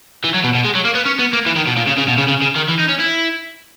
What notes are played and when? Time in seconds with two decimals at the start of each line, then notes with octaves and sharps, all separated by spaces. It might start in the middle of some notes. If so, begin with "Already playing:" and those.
0.24 E3
0.34 F#3
0.44 B2
0.55 B2
0.65 G#3
0.75 F#3
0.85 A#3
0.95 B3
1.06 C#4
1.19 B3
1.33 A#3
1.46 E3
1.56 D#3
1.67 B2
1.77 A#2
1.87 C#3
1.98 C#3
2.08 B2
2.18 C#3
2.28 C#3
2.42 C#3
2.56 D#3
2.69 E3
2.80 D#4
2.89 C#4
3.00 E4